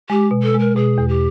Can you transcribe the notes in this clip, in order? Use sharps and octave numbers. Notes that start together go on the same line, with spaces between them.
G#3 G4
B2
A4
G#3
A#4
B2 G#4
E2
G4